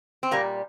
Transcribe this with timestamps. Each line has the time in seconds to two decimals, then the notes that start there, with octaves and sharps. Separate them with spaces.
0.23 C4
0.31 A#2 G3 A#3